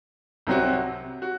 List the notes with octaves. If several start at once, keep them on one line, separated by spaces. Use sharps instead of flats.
C2 C3 F#3 C4 F#4
F#4